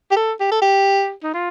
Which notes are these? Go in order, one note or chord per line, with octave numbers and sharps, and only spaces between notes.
G4
A4
G4
A4
G4
D#4
F4